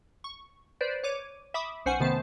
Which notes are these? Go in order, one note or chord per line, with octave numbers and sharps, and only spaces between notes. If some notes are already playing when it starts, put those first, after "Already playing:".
C#6
B4 C5 D5
C#5 D6 D#7
E5 B5 D6 D#6
B1 C#4 C5 F#5 G#5 C#7
C3 D#3 A3 B3 C5 A5